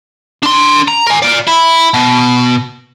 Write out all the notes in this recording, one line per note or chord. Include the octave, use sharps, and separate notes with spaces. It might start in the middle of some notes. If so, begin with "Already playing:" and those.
D4 C6
A#5
A#4 G#5
F4 D5
E4
B2